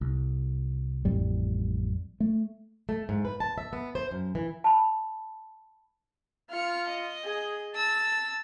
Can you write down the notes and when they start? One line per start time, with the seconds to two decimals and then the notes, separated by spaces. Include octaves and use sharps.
0.01 C2
1.05 A1 F2 G3
2.20 A3
2.89 A3
3.09 G#2
3.25 B4
3.40 A5
3.58 E5
3.73 B3
3.95 C5
4.11 F#2
4.35 E3
4.64 A5 B5
6.50 F4 F6 C#7
6.88 D#5
7.25 G#4
7.76 A5 E6